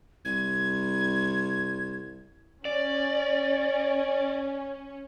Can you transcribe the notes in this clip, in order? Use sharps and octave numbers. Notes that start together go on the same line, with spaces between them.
C2 G#6
C#4 D5